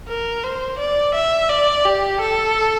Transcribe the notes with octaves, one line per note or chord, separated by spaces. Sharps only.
A#4
C5
D5
E5
D5
G4
A4